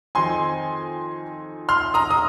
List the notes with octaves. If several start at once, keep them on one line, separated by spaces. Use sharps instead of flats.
F2 D#3 C4 D#4 G#5 C6
C6 F6
A#5 D#6
D#6